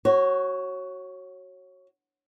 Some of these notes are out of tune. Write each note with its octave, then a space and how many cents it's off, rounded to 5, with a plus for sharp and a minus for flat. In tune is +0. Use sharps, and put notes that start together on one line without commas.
F#4 +15 C#5 -20